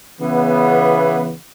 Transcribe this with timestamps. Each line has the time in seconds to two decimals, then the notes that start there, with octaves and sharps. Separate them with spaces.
0.19 C#3 E3 B3